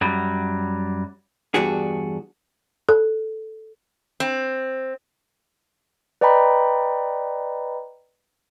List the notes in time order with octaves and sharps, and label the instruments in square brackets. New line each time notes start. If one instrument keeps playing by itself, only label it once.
[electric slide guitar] F#2 F#3 G3
[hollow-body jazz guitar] E2 G2 D4 F#4 G#4
[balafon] A4
[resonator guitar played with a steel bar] C4
[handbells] B4 D5 D#5 G5 A#5 B5